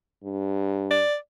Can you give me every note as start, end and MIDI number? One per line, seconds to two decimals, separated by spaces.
0.24 1.04 43
0.91 1.16 74